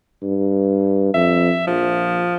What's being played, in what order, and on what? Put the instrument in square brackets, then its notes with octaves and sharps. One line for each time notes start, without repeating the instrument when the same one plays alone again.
[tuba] G2
[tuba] F2 [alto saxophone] E5
[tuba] A#1 [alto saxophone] F3